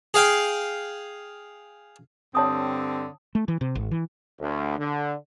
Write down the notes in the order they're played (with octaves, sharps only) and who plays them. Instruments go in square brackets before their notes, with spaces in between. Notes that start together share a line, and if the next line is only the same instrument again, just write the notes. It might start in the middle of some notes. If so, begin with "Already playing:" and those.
[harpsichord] G#4 F5 G5
[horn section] G2 D3 C4 [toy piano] C#5 A5 D#6
[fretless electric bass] A3
E3
C3
G#1
E3
[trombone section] D2
D3